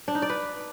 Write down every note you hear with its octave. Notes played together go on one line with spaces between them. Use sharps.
D4
D#4
D5
B4